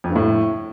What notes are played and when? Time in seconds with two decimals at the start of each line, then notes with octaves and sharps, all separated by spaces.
0.04 F2
0.10 G2
0.16 A2